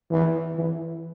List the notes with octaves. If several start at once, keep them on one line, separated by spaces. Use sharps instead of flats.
E3
E3